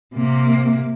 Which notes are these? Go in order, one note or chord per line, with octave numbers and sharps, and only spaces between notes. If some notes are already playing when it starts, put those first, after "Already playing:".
C3 A#3